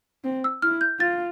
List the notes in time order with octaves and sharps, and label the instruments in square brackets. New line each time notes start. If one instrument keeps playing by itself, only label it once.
[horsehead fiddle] C4
[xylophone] E6
[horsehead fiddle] E4 [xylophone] F6
[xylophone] G6
[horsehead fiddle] F4 [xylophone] A6